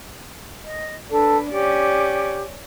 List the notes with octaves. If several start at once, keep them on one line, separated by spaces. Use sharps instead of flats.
D#5
D4 A4 B4
C#4 G4 D5